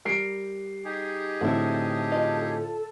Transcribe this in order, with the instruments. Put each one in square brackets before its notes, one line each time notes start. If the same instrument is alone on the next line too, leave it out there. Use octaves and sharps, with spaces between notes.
[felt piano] G3 C7 D7 [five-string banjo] A#4
[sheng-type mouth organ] D#4 G4 G#4
[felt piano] A2 D3 C4 [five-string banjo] E4 F#4 [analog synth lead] A4
[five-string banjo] F4 D#5